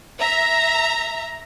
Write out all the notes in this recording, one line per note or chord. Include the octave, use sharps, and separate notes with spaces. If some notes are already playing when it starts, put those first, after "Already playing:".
E5 A#5